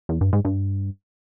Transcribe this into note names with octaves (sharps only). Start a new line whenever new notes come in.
E2
G2
G#2
G2